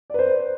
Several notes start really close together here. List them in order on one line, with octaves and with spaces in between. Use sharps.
D5 B4 C5